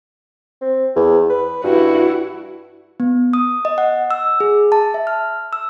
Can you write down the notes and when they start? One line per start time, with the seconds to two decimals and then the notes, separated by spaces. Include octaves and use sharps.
0.61 C4
0.96 E2
1.30 B4
1.64 G2 E4 F#4
3.00 B3
3.33 D#6
3.65 D#5
3.78 F#5
4.11 E6
4.40 G#4
4.72 A5
4.94 E5
5.07 F6
5.53 E6